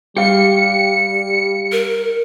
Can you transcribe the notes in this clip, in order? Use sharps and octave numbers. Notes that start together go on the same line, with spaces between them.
G3 G4 F5 C#7
A#4